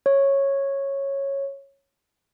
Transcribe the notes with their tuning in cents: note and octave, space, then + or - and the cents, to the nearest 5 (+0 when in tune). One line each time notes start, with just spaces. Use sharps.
C#5 -10